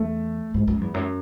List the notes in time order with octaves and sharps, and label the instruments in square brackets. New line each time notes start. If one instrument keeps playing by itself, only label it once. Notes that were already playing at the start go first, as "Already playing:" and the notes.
Already playing: [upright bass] E2 [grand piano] A3
[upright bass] G#2
F#2
E2
F#2